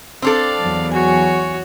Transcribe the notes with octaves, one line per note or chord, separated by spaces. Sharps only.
C4 D4 A4 D5 F5
E2 F#3
F#4 C#5 G#5